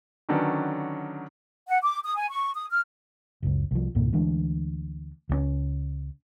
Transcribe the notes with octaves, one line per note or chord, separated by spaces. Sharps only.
D3 D#3 F#3 C#4 D4 B4
F#5
D6
D#6
G#5
C#6
D#6
F6
F#1 C#2
C2 F3
C#2 G#2 B2 A#3
D2 E3 G#3 D4
C#2 F3 C#4